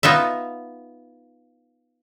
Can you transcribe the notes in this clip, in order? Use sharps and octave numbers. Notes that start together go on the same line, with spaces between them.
B3 D#4 F4 E5